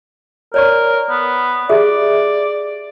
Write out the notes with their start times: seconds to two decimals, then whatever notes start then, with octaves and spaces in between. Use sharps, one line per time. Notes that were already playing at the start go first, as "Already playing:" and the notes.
0.54 A#4 C#5 D5 C#6
1.09 B3
1.69 G4 G#4 D5 E5